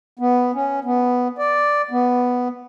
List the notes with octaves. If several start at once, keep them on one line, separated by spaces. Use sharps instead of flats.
B3
C#4
B3
D5
B3